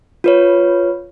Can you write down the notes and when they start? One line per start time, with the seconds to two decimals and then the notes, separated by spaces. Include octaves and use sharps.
0.24 F4 B4 C#5